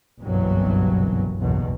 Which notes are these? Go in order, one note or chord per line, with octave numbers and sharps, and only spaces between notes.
F#1 C2 G2 B2 E3 F#3
F#1 B1 E2 B2